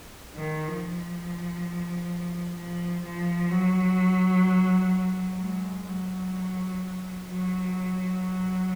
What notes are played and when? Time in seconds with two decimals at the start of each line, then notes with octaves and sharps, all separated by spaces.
0.36 D#3
0.68 F3
2.56 F3
3.05 F3
3.51 F#3
5.40 G#3
5.89 F#3
7.29 F#3